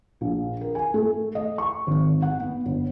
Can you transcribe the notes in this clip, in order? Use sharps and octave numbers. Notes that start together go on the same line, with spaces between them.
A#1
A#4
G#5
A3
D#5
C#6
G#1
F#5
B3
G1